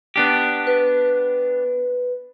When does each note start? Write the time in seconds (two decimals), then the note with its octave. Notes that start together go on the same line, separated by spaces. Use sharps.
0.16 B3 D4 G4
0.67 B4